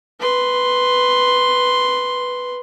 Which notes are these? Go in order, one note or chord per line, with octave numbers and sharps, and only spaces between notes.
B4 C6